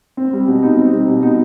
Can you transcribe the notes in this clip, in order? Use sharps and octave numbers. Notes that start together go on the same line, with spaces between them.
C4
G3
B2
D#4
C4
G3
B2
D#4